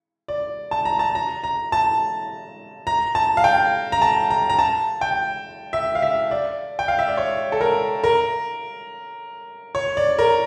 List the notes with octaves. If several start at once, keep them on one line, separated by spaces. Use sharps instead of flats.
D5
A5
A#5
A5
A#5
A#5
A5
A#5
A5
F5
G5
A#5
A5
A#5
A#5
A5
G5
E5
F5
E5
D5
G5
F5
E5
D5
C#5
A4
A#4
A#4
C#5
D5
A#4